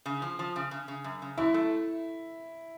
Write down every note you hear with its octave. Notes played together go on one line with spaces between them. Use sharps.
C#3
F3
F3
C#3
C#3
C#3
F#2
C#3
F#2 E4
A3